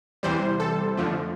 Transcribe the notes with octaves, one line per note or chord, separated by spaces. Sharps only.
E2 C3 E3 G3 C5
A4
F2 D3 F3 A3